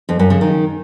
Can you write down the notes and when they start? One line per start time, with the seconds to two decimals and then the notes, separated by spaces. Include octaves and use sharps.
0.09 F2
0.19 F#2
0.30 C#3
0.41 D#3